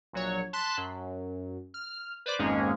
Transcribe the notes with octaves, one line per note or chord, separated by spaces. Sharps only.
A#1 F#3 C#5
A5 C6 F#6 B6
F#2
F6
B4 C5 D5 D6
G#1 F2 G#2 G#3 A#3 C#4